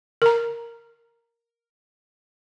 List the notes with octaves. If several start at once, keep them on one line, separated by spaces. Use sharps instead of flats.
A#4 A#5